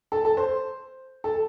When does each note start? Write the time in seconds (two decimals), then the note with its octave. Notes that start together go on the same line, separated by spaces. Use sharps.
0.12 A4
0.25 A4
0.37 C5
1.24 A4